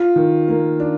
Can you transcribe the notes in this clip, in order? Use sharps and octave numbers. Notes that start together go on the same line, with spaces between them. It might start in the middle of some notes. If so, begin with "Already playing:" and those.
Already playing: F4
D#3
A#3
D4